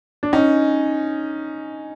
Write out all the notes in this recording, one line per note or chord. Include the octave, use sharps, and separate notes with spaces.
D4
C#4 D#4